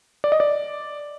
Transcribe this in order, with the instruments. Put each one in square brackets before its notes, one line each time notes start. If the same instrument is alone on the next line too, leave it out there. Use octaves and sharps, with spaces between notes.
[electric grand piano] D5
D#5
D5